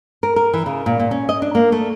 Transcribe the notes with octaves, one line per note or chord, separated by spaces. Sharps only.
A#4
A#4
E3
C#3
A#2
A#2
C#4
D#5
D4
A#3
A3